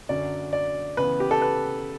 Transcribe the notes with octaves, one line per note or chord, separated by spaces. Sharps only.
F#2 D3 F#3 C#4 D5
D5
C#3 E3 B3 B4
G4
A4
B4